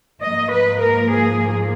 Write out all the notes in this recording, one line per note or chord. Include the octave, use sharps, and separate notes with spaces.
G#2 F3 A#3 D#5
B4
A#4
G#4